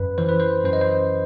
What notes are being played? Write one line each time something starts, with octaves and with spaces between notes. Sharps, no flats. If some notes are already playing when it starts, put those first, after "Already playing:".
Already playing: F#2 B4
E3 C5
B4
C5
F#2 C5
D#5
C5